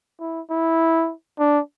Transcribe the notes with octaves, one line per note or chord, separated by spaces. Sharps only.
E4
E4
D4